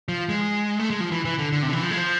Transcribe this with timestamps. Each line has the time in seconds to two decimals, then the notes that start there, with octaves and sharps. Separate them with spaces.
0.08 F3
0.29 G#3
0.79 A3
0.90 G#3
1.00 F3
1.11 E3
1.25 E3
1.39 D3
1.52 D3
1.63 C3
1.68 D3
1.73 E3
1.83 F3
1.91 G#3
1.97 F3